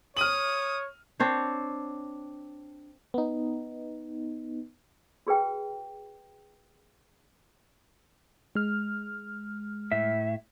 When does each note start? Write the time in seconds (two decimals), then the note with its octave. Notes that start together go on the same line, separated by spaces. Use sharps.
0.17 C#5 D#6 F6 D#7 F#7
1.20 C4 D4 C5 C#5
3.14 B3 D#4
5.27 F#4 G#4 B4 G5
8.55 G#3 F6
9.92 A2 E5